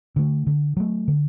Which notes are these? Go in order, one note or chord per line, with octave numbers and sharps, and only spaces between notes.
D3 A3
D3
F#3 A3
D3